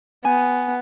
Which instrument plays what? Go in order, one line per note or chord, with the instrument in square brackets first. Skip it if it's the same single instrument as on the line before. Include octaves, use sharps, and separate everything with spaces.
[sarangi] B3 [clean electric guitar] G#5